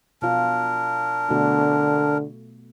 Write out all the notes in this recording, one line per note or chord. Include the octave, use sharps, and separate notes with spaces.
B2 D4 F4 A#4
B2 D3 A3 F#4